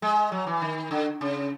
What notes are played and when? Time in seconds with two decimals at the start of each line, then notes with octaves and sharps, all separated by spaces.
0.02 G#3
0.32 F#3
0.47 E3
0.62 D#3
0.91 D3
1.21 C#3